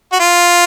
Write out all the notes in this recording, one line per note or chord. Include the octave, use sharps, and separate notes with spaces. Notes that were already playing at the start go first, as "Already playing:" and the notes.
F#4
F4